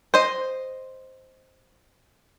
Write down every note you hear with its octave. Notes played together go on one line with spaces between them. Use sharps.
C5 D#5